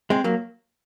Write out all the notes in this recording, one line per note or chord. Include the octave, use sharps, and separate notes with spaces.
G#3 C4
F#3 A#3